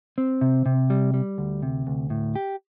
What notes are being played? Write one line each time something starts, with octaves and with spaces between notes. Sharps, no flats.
C4
C3
C3
G3
G3
D2
C3
D2
A2
G4